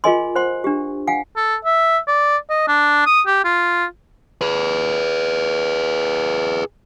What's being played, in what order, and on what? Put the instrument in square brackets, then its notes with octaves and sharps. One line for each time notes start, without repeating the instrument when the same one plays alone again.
[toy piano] F4 G#4 A#4 D#5 G#5 C6
C5 F#5 C6
D4 G4
F5 F#5 G#5
[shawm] A4
E5
D5
D#5
D4
D#6
G4
F4
[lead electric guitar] G#4 B4